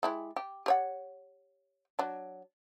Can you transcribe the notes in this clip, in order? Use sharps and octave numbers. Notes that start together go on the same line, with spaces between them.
G#3 E4 G4
G4
G4 C#5 F#5
F#3 D4